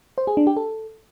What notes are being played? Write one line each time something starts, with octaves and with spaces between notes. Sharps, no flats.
C5
G#4
D4
G4
A4